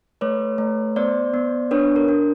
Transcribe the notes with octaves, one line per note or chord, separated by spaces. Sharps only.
A3 B4 C#5
A3
B3 C5 D5
B3
D4 B4 C#5
A#4
D4